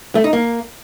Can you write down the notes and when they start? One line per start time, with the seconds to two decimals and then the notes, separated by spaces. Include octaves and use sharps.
0.15 A3
0.24 D#4
0.33 A#3